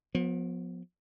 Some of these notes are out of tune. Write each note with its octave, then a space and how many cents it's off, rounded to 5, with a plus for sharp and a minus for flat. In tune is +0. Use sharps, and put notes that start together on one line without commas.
F3 +40 B3 +0